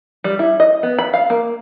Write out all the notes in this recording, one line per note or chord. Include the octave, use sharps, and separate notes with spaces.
G3
E4
D#5
B3
B5
F5
A#3